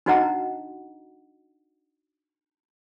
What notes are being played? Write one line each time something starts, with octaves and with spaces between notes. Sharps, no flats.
D4 D#4 F#4 D#5 F#5 A#5